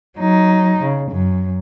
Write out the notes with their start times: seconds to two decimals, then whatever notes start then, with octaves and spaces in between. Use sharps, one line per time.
0.18 F#3 D#4
0.83 C#3
1.12 F#2